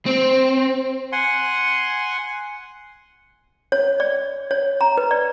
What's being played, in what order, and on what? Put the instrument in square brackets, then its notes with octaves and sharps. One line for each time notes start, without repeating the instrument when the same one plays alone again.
[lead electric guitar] C4
[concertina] F#5 G#5 C6
[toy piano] C#5
D5
C#5
A#5
B4
D5